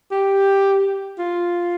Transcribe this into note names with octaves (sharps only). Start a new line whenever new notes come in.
G4
F4